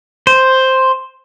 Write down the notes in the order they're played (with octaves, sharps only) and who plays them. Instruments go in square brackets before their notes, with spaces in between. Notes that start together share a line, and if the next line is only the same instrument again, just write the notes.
[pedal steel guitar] C5